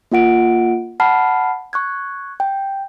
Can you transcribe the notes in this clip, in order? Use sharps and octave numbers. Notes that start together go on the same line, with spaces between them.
A#3 F4 F#5 D7
F#5 A5 B5 F6 C7
C#6 F#6 G#6
G5